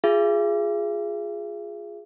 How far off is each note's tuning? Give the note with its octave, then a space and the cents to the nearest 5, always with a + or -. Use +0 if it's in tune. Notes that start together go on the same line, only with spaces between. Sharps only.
F4 +10 G#4 +0 E5 +45